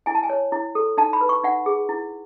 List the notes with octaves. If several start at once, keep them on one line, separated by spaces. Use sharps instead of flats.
E4 G#5
A5
G#5
C#5
E4
A4
D#4 A5
B5
B4
C#6
D#4 F#5
G#4
E4